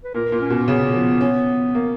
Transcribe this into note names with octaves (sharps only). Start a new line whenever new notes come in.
B4
A#2 A#4
A#2
C#4
B2
C#3 B3
F3
C#4
A#3